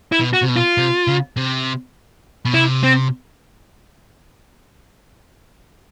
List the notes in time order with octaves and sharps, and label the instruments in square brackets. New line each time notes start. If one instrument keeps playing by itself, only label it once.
[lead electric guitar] E4
[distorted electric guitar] B2
[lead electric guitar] F#4
[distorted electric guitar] C3
B2
[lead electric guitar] F4
[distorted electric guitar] C3
C#3
C3
B2
[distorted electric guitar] C3 [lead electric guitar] E4
[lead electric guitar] C4